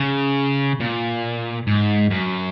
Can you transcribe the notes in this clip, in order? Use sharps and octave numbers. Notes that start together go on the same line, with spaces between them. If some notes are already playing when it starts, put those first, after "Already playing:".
Already playing: C#3
A#2
G#2
F#2